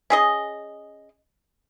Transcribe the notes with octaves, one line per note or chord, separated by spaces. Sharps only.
C#4 G#4 D#5